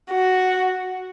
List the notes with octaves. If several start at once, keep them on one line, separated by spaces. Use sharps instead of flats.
F#4